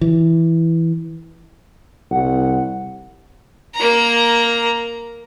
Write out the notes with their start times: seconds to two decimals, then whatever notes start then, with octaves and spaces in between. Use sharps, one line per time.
0.01 E3
2.11 C2 F#5
3.75 A#3 A#5